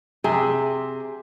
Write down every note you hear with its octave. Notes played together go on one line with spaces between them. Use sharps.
C3 G#4